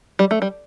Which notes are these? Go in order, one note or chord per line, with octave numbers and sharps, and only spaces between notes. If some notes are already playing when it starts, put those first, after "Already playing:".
G3
A3
G3